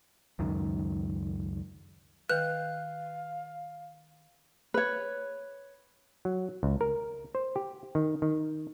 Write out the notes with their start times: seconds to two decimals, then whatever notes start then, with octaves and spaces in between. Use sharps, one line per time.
0.39 C#2 F#2 D#3
2.30 D#3 B4 F5 G5 F#6 G6
4.74 B4 C#5
6.25 F#3
6.63 C#2
6.81 A#4
7.35 C5
7.56 G4
7.95 D#3
8.22 D#3